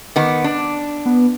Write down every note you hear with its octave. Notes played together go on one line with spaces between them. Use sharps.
D#3 B3 D6
D4
B3